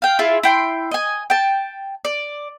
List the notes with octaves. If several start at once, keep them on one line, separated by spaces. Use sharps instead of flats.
F5 G5
E4 F4 G#4 E5
E4 G5 C6
D#5 G#5
G5 A5
D5